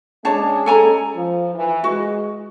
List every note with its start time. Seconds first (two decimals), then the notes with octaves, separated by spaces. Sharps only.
0.25 G#3 C#4 D4 C#5 A5
0.66 A4 G#5 A#5
1.15 F3
1.54 E3
1.84 G#3 F#4